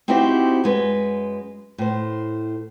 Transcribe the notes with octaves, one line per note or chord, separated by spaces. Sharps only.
C4 D#4 E4 F#4 G4 C5
F#2 G#3 B4
A2 C5